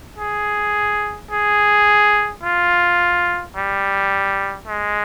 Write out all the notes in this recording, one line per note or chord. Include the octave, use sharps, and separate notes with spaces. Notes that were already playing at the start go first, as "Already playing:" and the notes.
G#4
G#4
F4
G3
G#3